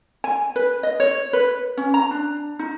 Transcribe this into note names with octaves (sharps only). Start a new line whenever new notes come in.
G#5
B4
D#5
C#5
B4
C#4
A#5
D4
D#4